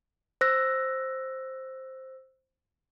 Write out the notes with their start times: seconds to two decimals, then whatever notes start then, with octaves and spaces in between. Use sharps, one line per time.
0.41 C5 E6 F#6 A#6